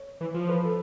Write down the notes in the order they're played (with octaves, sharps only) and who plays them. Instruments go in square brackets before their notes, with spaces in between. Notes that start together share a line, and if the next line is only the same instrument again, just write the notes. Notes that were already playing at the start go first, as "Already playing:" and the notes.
Already playing: [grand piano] C#5
[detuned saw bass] E3
F3
[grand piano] B4
A4